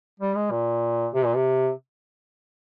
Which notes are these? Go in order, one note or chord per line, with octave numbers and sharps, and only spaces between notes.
G3
G#3
A#2
C3
A#2
C3